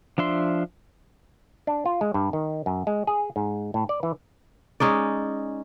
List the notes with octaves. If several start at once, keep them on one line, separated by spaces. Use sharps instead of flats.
F3 D4 E5 C6
D4
F4
G#3
G2
D#3
F#2
G#3
G#4
G#2
A2
D5
E3
G#3 C#4 D#4 D5